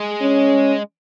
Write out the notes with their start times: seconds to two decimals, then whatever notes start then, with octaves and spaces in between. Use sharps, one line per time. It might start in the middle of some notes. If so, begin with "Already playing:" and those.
Already playing: G#3
0.22 C#4